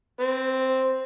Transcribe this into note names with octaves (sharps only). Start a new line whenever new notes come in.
C4